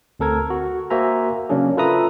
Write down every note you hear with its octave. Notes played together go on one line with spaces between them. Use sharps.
D2 C4 A4 A#4 G#6
F#4
A#3 F#4 C5 E5 G#5 A#5
C#3 F#3 A#3 C#4 D4 G#4
F4 A4 B4 E5 A#5 D#6